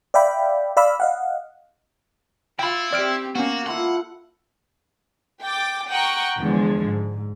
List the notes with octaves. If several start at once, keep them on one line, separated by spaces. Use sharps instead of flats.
D5 E5 F5 G5 B5
D5 F5 B5 E6
D#5 F5 F#5
E4 F4 G5 B5
C4 G4 D5 F6 D7
A#3 B3 C#4 F#4
E4 F4 A4 F#5
G5 D6 A6
F#5 G5 A#5 C#6 D#6
E2 D3 F3 G#3
G#2